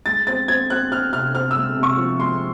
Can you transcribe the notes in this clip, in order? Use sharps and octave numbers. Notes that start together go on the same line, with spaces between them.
G#3 A6
C4 A6
C4 G#6
C4 F#6
C4 F6
C3 F6
C4 F6
E6
G#3
C3
C#6
F3
G#3 C6